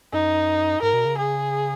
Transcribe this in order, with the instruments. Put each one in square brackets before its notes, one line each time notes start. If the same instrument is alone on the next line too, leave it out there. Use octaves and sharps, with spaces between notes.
[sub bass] F#2 [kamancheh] D#4
[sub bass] G#2 [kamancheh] A#4
[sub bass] B2
C#3
[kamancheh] G#4